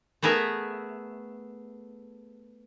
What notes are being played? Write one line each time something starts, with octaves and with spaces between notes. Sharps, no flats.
A3 B3 G#4 A#4 E5